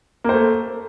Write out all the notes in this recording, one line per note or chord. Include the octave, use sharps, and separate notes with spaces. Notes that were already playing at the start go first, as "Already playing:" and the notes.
A3 A#3 C5